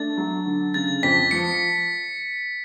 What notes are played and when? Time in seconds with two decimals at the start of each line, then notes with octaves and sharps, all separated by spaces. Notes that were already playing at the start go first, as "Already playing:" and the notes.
Already playing: A3 D4 A6
0.17 F#3
0.46 D3
0.74 C#3 A6
1.03 F2 B6
1.31 F3 C#7